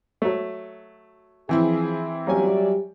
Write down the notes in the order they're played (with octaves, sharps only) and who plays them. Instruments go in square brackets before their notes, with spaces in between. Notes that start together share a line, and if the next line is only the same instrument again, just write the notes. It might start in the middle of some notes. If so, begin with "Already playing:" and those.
[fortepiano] F#3 A3
[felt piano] E3 C4 E4 [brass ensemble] F3 G#4
[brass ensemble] F#3 D5 E5 [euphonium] G3 [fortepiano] A#3 C#4 G#5